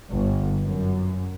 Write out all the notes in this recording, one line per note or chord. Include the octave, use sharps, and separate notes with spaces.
G1
F#2